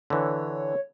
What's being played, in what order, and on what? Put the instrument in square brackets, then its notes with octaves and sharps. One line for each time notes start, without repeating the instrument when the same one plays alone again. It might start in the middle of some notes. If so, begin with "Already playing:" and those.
[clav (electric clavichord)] D3 E3 [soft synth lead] C#5